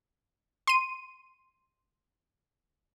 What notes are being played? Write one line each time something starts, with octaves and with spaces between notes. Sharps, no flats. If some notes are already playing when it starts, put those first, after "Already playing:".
C6 D#7